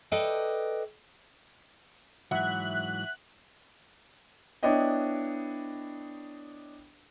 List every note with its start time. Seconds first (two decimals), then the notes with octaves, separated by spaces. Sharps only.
0.12 A4 B4 D5 D#5 G5
2.31 G#2 E3 F#3 E5 F#5 F#6
4.63 B3 D4 E4 C#5 D#5 G5